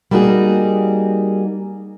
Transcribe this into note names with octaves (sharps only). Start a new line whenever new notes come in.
G3 A#3 D#4 F#4 G#4